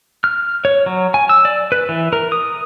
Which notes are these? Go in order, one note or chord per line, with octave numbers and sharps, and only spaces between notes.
F6
C#5
F#3
G#5
E6
D5
B4
E3
A#4
D#6